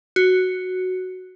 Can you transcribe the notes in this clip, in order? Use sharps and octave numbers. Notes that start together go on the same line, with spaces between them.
F#4